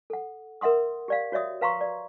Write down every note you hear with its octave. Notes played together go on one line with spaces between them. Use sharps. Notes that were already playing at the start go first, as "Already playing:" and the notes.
A4 F#5
A#4 E5 F#5 C6 D#6
G4 D5 F5
F#4 C#5 D5 E5 D#6
B4 F5 A#5 C6 C#6
D5